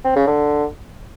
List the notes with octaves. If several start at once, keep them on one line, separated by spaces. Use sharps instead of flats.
C4
C#3
D3